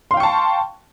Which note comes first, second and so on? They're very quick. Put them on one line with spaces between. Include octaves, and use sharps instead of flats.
C6 F5 G5 C#6 A5